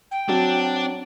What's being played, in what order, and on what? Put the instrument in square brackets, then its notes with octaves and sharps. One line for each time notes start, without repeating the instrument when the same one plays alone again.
[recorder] G5
[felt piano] F#3 [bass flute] C4 [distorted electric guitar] D4